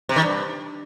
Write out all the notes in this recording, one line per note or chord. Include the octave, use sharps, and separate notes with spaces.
C3
D#3
G2